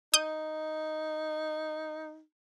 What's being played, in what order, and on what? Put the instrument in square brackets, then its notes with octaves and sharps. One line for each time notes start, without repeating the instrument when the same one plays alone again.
[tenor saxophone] D#4 [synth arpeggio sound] D#6 G6 D#7